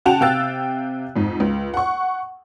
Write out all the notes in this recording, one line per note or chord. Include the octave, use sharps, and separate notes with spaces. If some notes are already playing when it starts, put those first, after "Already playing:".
C#3 F#4 F#5 G5 A5 F7
C3 F5 G5 E6 F#6 A6
F2 G#2
C#2
F#5 C#6